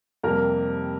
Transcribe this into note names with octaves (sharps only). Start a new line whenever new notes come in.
F2 C3 G3 A#3 A#4